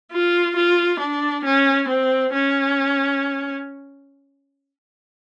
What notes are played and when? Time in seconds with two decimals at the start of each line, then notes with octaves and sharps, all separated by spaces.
0.12 F4
0.56 F4
1.00 D4
1.45 C#4
1.89 C4
2.33 C#4